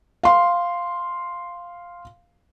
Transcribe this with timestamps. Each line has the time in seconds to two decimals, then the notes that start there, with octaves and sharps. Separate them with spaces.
0.23 F5 C6